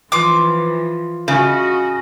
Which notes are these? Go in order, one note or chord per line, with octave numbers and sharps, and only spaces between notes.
E3 F3 F4 D6
C#3 F#4 D#5